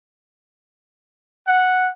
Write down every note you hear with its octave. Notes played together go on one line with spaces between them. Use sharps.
F#5